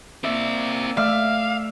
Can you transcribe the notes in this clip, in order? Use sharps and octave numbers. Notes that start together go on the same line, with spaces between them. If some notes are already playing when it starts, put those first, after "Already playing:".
A#3 C4 D5 E5
A3 D5 E5 F5 F6